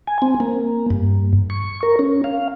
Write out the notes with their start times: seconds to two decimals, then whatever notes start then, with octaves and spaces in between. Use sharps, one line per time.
0.07 G#5
0.22 C4
0.40 A#3
0.90 G2
1.50 C#6
1.83 A#4
1.99 C#4
2.24 F5